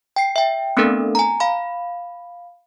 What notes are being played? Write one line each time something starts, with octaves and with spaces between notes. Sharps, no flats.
G5 C7
E5 G5
A3 B3 C4 D4 A4 A#4
G#5 A#5
F5 B5